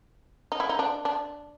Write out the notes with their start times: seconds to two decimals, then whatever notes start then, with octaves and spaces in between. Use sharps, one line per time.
0.52 D#4
0.60 E4
0.69 D#4
0.79 D4
1.05 D4